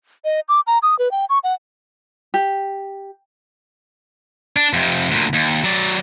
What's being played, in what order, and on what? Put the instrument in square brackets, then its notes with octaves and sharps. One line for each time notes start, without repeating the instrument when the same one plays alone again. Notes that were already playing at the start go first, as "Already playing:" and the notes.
[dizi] D#5
D6
A#5
D#6
B4
G5
C#6
F#5
[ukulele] G4
[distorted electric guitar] D4
F2 C3
D2 A#2
D#2
F#3 D5